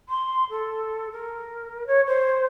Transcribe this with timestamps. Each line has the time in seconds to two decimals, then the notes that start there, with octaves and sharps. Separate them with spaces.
0.09 C6
0.50 A4
1.11 A#4
1.86 C#5
2.06 C5